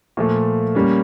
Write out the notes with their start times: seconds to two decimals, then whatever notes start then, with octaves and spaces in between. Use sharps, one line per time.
0.17 A#2 F3 A3
0.75 G3 A#3 C#4